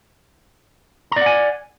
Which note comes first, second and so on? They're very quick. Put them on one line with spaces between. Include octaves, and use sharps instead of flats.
A#5 D5 F#5 G#5